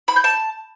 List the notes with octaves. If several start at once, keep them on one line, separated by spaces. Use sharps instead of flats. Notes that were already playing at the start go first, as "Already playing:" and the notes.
B5
G6
A5